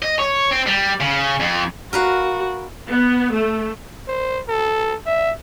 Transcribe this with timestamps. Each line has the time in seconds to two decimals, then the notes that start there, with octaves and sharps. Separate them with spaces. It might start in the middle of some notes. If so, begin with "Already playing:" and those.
0.02 D#5
0.19 C#5
0.51 C4
0.67 G3
1.00 C#3
1.40 F2
1.93 F#4 A#4 B4 F5
2.88 B3
3.31 A3
4.08 C5
4.49 A4
5.06 E5